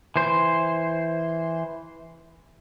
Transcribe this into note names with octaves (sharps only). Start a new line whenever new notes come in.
E3 C5